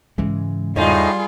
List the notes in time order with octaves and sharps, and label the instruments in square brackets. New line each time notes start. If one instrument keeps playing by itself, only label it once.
[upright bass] G#2 C#3 [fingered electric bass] E3 G#3
[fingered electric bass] E2 [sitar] A2 D#4 [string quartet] G3 F4 G#4